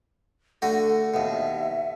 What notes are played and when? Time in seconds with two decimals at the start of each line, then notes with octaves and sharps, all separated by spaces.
0.62 D3 A3 F#4 A4
1.14 D#2 B2 E5